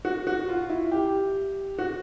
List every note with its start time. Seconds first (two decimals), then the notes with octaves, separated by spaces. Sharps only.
0.05 F#4
0.27 F#4
0.49 F4
0.70 E4
0.91 G4
1.79 F#4